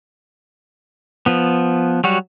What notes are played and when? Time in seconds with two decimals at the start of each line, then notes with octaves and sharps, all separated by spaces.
1.26 F3 B3
2.04 F#3 G3 F#4